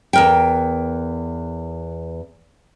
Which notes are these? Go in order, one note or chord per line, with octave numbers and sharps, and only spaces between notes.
E2 A#4 G5